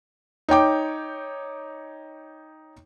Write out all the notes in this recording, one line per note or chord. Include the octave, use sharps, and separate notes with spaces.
D#4 C#5 G5 D6